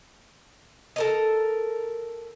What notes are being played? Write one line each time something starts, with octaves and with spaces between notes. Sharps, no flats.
A4 A#4 D#5